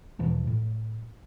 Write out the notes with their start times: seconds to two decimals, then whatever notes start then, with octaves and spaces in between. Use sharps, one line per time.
0.19 E2 B2 E3 F3
0.47 A2